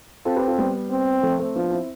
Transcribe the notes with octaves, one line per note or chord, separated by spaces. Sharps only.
C4 F4 A4
G4 B4
F4 A4
G3 B3
C4
F3 A3
A3 C4
F3 B3 D4
C4 E4